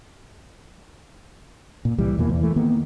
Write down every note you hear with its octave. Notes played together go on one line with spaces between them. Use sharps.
A#2
C2 E3 G3
E2 B2 E3 A#3
E2
E3 A3
D#3 A#3 B3